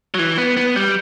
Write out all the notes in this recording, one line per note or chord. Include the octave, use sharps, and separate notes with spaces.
F#3
E3
B3
B3
G3